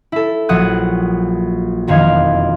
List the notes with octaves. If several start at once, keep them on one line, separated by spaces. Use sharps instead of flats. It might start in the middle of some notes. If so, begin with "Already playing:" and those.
E4 A4
A#1 F#3 F#5 D#6 F#6
E1 F2 D#3 F5 G#6